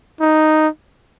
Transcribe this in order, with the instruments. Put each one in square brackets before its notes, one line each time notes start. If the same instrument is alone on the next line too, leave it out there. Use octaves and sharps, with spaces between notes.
[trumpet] D#4